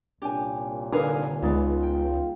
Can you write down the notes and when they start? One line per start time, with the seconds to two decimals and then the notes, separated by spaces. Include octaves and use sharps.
0.22 C2 A#2 C#4 D4 G4 G#5
0.92 D3 D#4 A#4 B4 F5 G#5 D#6
1.42 C#2 G#3 B3 D#4 F4 D5
1.83 G5